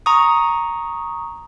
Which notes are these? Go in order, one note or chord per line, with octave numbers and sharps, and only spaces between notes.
A#5 C#6 D#6